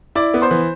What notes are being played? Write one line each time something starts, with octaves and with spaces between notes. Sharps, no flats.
E4 D5 D6
B3
C5 C6
E3